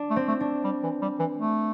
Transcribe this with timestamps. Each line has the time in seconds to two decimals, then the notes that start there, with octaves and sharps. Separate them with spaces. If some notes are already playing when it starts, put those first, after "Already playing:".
Already playing: D4
0.11 A3
0.16 C4
0.28 A3
0.40 D4
0.64 G3
0.83 E3
1.02 G3
1.19 E3
1.37 A3